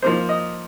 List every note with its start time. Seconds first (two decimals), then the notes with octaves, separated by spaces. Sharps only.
0.02 F3 A#3 D#4 C5
0.29 D#5